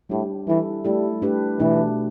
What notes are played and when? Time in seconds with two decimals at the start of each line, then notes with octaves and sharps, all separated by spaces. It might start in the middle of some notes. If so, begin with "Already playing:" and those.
0.09 A2 G3 D4 G4
0.47 E3 G3 E4 A4
0.85 G3 A3 E4 A4
1.22 A3 D4 G4 B4
1.60 B2 E3 A3 D4